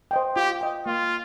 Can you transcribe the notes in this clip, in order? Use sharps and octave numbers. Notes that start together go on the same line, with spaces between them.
C5 D#5 G5
F4 G4
C5 D#5 G5
A#3 F4